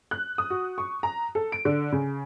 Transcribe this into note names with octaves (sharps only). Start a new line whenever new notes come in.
F#6
D#6
F#4
C#6
A#5
A4
D7
D3
C#3